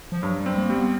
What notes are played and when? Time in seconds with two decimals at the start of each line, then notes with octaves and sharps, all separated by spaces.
0.12 F3
0.22 G2 F#3
0.40 G3
0.46 C4
0.58 A#3
0.70 G3
0.76 B3